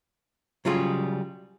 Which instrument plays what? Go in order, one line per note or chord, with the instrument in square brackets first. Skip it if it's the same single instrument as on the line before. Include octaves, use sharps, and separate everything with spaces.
[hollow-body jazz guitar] C#3 F#3 G3 F4 G#4